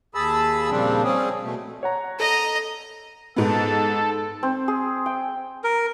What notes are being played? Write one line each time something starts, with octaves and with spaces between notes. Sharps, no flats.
D#2 G#4 A5 B5 E6
A#2 C#3 F3 G3 C4 D4
G3 C4 C#4 G#4
B2 A3
C#5 F#5 A#5
A4 D#5 A#5
G#2 B3 A4
C4
G#4
G5
A#4